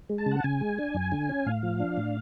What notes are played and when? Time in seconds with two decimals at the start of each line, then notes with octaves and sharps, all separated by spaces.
0.10 G#3
0.18 A5
0.26 C#3
0.31 F#5
0.44 C#3 G#5
0.61 G#3
0.78 D4
0.94 F#2
1.12 D3
1.29 C#4
1.46 A2 F5
1.63 F3
1.80 D4
1.97 A2